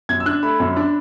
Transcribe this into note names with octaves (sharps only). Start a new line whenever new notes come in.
F#2 G#6
E6
D4 F#6
A3 B5
F#2
D4